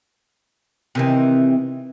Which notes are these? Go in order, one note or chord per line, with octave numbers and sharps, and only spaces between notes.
C3 D#3 E3